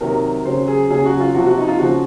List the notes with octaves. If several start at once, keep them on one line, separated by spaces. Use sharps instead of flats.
C3 D#3 F#3 A#4
C#3 F#3 C5
G#4
C#3 F#3 G#4
F#4
F4
C3 F3 F#4
F#4
D#4
F4
C#3 F3 F#4